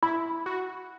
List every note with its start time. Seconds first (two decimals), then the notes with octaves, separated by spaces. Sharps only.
0.02 E4 B5
0.46 F#4